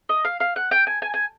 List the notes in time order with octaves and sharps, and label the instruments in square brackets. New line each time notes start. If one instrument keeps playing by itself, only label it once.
[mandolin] D#5
F5
F5
F#5
G5
G#5
G#5
G#5